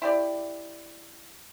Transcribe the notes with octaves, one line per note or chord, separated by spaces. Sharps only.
E4 G4 D5